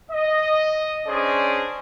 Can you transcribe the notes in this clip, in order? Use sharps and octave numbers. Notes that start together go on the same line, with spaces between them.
D#5
C#4 D4 G#4 C5 D5 D#5